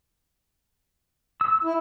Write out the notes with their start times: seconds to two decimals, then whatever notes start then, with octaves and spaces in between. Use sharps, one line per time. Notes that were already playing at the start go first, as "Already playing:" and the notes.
1.41 E6
1.64 E4